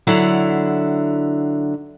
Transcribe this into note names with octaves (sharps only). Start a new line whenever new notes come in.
D3 F#3 E4